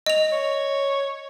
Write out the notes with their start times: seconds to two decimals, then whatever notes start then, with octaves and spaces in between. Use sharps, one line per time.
0.06 D#5 F7
0.32 C#5